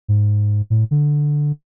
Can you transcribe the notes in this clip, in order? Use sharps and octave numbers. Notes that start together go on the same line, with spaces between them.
G#2
A2
D3